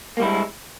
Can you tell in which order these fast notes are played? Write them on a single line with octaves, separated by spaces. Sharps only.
A#3 G3 E4 G#3